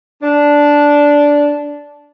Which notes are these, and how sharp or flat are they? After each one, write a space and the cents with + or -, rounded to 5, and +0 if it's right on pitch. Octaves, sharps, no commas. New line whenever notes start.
D4 -10